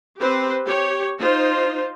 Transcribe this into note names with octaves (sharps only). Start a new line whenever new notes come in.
C4 G4 B4 C5
G4 C#5
D#4 F4 C5